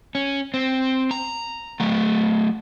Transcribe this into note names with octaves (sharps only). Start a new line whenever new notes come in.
C#4
C4
A#5
F#3 A3